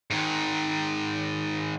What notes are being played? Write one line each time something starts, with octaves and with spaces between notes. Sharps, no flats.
G#2 D#3